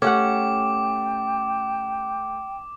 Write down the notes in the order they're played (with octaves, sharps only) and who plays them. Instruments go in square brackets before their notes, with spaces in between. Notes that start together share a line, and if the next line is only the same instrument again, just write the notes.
[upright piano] A3 [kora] C#4 G4 F#5 [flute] G5 [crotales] D6